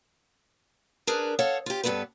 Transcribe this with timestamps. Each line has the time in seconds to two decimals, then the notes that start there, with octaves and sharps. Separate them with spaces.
1.07 D4 G#4 A#4 B4
1.39 A4 C#5 F5 F#5
1.66 F4 G4
1.84 G2 C#3 B3 A4 B4